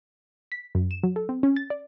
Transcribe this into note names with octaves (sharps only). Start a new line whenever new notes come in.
B6
F#2
E7
F#3
A4
C4
C#4
A6
D5